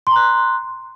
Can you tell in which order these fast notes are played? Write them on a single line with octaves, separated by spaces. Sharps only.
C6 A#5 F#6